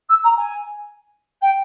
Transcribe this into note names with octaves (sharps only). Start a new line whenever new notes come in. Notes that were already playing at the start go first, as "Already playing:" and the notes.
E6
A#5
G#5
G5